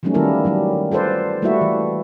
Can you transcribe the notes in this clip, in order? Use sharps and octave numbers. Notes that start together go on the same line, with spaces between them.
E3 F#3 G3 A3 C#4 D#4
D#3 G3 A#3 E4 A4 A#4
D#3 F#3 G3
F4 A4 B4 C5 D5
G3 A3 A#3 E4 F#4 E5
E3